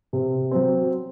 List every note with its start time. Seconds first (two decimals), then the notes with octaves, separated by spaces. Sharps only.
0.13 C3
0.51 F#3 C4